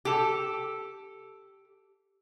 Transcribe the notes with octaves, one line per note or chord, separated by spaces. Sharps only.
G4 A4